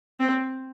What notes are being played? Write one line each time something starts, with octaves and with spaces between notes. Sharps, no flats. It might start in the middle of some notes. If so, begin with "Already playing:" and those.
C4